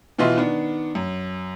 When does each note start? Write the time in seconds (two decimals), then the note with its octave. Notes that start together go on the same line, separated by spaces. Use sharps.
0.18 B2 E3 F4 D#5 E5 C6
0.37 D#3 B3 D4
0.95 F#2